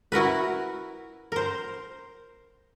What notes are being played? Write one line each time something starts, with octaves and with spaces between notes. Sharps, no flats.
E4 F#4 A#4 B4
A#4 C5